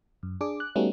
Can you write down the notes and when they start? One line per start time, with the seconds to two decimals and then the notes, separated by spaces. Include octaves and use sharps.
0.23 F#2
0.41 D4 G#4 D6
0.60 F#6
0.76 G3 A3 B3 C#4 D#4 F#4